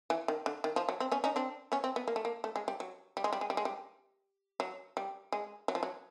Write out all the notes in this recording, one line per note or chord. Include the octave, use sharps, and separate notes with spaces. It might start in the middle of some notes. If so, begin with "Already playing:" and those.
E3
D#3
D3
D#3
F3
F#3
C4
B3 C#4
C#4 D#4
C4 D4
B3 C#4
C4
B3
A#3
A3
A#3
A3
G#3
G3
F#3
G3
G#3
G3
G#3
G3
G#3
G3
F#3
G3
G#3
F#3
F3
F#3